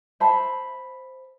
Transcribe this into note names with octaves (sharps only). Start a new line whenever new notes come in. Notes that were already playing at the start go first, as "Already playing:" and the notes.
C5 E5 A5 B5